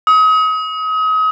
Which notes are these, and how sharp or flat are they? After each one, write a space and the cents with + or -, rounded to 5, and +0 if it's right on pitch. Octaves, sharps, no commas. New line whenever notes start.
D#6 +35